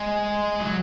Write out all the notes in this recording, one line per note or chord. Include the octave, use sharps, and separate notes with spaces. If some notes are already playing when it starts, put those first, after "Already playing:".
Already playing: G#3
F#3